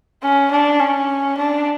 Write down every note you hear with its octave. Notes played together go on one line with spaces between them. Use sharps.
C#4
D4
C#4
D4